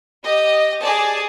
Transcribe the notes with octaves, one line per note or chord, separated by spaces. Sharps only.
G4 D#5
G#4 D5 A5